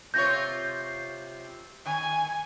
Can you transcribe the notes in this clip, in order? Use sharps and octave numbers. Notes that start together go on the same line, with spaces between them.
C3 F4 C#5 G6 A#6
D#3 G#5